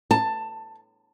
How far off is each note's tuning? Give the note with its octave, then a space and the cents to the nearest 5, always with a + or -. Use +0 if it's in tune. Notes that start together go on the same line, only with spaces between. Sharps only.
A5 +15